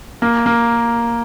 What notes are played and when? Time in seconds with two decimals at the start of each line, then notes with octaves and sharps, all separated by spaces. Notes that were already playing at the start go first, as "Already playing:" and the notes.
0.22 A#3
0.46 A#3